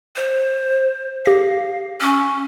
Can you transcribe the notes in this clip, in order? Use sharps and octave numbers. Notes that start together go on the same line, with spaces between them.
C5
G4 F5 A#6
C#4 C#6 E6